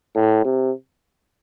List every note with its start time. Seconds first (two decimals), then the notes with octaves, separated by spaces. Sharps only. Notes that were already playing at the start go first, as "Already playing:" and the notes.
0.15 A2
0.45 C3